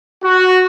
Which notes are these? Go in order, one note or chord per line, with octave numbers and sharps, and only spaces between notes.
F#4